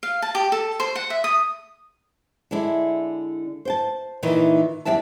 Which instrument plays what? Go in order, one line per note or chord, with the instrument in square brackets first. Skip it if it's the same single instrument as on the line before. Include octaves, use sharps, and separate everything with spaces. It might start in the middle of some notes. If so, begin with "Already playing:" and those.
[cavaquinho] F5
A5
G4
A4
C5
F#5
E5
D#6
[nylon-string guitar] D3 G#3 D4 E4
C5 G5 A5
A#2 D#3 E3 D#4 E4
E2 G3 G#3 D4 E5 A5